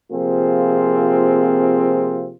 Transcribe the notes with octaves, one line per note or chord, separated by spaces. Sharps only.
C3 F3 A#3 C4 F4 G#4